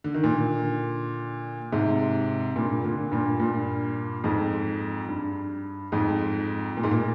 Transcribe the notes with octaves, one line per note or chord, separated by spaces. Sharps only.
D3
D#3
A#2 D3
G#2 C3
G2 A#2
A#2 D3
G2 A#2
G2 A#2
F2 G#2
G2
F2 G#2
A#2
G#2
A#2